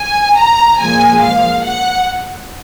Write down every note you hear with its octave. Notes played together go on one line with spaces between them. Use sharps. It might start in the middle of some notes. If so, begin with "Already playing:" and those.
Already playing: G#5
A#5
A#2 F3 G#3 G#5
F5
F#5